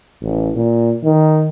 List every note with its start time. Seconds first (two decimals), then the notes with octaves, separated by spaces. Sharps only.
0.22 A1
0.56 A#2
1.04 D#3